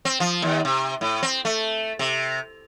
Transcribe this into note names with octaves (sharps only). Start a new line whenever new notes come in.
C4
F3
D#2
C3
A2
C4
A3
C3